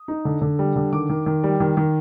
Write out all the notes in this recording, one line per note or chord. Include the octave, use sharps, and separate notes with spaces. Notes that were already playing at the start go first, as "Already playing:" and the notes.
Already playing: D#6
D#4
D3
D3
G3
D3
D#3 D6
D#3
D#3
G3
D#3
D#3